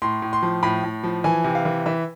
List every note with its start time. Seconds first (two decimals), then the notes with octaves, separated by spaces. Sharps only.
0.02 A2 C6
0.22 A2
0.33 C6
0.43 F3
0.63 A2 B5
0.84 A2
1.04 F3
1.24 E3 G#5
1.44 C3
1.55 F5
1.65 E3
1.86 E3 E5